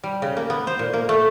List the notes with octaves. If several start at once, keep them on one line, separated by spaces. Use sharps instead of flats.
G3
C#3
A#3
B3
C5
A#2
A#3
A3